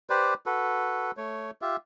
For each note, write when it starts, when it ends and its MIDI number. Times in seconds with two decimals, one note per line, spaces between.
0.10 0.34 67
0.10 0.34 71
0.10 0.34 72
0.10 0.34 74
0.46 1.11 66
0.46 1.11 69
0.46 1.11 71
1.17 1.51 57
1.17 1.51 73
1.62 1.76 65
1.62 1.76 67
1.62 1.76 76